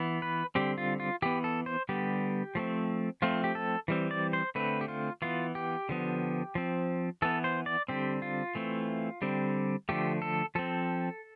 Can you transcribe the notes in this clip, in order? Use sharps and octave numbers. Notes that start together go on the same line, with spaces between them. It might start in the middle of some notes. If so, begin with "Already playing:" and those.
Already playing: E3 B3
B4
D3 G3 C4 G4
F4
F4
E3 B3 G4
A4
C5
D3 G3 B3 G4
F3 A3 C4
F3 A3 C4 F4
G4
A4
E3 G3 C4
D5
C5
D3 A3 C4 B4
G4
F4
E3 B3 F4
G4
D3 F3 B3
F3 C4
E3 B3 A4
C5
D5
D3 G3 C4 G4
F4
E3 A3 C4
D3 G3 C4
D3 F3 A3 G4
A4
F3 C4 A4